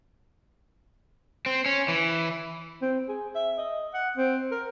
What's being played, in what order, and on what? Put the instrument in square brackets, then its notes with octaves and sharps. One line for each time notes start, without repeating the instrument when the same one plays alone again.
[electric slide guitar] C4
C#4
E3
[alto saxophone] C4
G#4
E5
D#5
F#5
C4
A#4